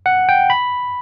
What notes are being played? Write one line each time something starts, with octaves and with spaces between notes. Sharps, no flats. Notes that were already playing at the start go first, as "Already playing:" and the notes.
F#5
G5
B5